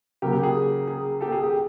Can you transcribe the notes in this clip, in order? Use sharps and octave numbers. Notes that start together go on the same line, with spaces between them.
C#3 F#3 A#3 G4
G4
G#4
G#4
G4 A4
G#4
G4